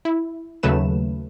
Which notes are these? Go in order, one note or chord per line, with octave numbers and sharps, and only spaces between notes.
E4
D#2 C#3 F#3 A3 B4 E7